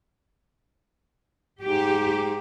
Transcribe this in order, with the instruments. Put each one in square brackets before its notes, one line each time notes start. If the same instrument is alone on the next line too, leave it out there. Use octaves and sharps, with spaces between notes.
[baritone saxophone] G#2 [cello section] G4